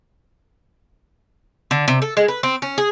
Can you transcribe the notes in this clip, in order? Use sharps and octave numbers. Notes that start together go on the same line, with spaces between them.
D3
C3
A4
G#3
B4
C4
C#4
G#4